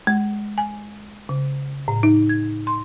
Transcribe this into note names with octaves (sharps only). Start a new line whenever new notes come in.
G#3
G#5
C#3
A2
D#4
G#6
C6